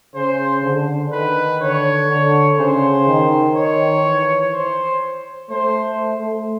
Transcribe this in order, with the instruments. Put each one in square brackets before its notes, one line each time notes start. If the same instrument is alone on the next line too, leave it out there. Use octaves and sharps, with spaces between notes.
[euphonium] C#3 [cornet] C5
[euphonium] D3
[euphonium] D#3 [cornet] B4
[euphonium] D3 [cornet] C#5
[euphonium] D3
[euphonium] C#3 [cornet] C5
[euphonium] D#3
[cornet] C#5
[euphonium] E3
[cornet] C5
[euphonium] A3 [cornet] C5